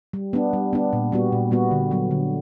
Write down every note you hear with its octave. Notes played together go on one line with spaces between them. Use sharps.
G3
B3 D4
G3
B3 D4
A#2
G3 B3 F#4
A#2
G3 B3 F#4
D3
F#3 B3
D3